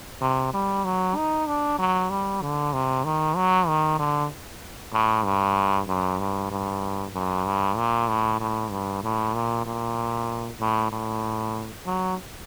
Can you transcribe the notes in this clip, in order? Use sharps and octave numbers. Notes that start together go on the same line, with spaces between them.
C3
G3
F#3
D#4
D4
F#3
G3
D3
C3
D#3
F#3
D#3
D3
A2
G2
F#2
G2
G2
F#2
G2
A#2
A2
A2
G2
A2
A#2
A#2
A2
A2
F#3